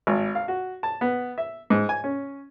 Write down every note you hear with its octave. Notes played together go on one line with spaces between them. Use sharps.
G#1
F5
F#4
A5
B3
E5
G#2
G#5
C#4